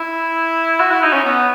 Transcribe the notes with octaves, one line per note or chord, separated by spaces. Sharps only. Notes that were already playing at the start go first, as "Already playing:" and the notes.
Already playing: E4
F#4
E4
D#4
C#4
B3